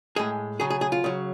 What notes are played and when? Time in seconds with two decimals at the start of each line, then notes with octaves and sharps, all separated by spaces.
0.16 A2 G#3 G#4
0.60 C#3 F#3 G#4
0.70 G#4
0.81 G#4
0.92 F4
1.04 C#3 F#3